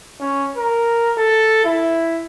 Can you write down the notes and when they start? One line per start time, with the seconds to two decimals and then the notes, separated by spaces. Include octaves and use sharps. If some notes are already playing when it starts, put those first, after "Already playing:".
0.21 C#4
0.57 A#4
1.18 A4
1.65 E4